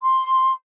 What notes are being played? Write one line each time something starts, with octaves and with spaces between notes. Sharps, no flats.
C6